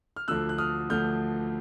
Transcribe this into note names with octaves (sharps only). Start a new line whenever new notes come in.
F6
D2 D3 F3 A3 E6 F#6
F#6
D#6 F6
D2 D3 F3 A3 F6 G6